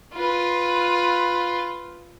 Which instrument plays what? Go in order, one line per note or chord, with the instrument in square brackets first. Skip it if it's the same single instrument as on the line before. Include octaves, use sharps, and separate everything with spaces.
[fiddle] F4 B4